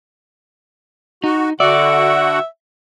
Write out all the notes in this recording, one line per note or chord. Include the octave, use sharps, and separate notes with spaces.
D#4 F#4
D3 F#4 D5 E5 F#5